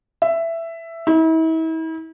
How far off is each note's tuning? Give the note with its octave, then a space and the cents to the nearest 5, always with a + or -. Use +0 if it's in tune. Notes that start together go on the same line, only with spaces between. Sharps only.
E5 +10
E4 -40